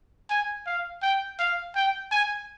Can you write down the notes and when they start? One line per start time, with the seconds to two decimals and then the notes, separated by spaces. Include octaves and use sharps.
0.30 G#5
0.66 F5
1.02 G5
1.39 F5
1.75 G5
2.12 G#5